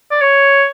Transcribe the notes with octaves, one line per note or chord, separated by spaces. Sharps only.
D5
C#5